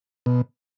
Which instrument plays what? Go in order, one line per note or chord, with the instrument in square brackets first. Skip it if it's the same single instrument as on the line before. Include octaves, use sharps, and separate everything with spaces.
[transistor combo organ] B2